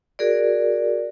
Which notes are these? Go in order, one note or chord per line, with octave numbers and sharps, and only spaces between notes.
F#4 G#4 A#4 D5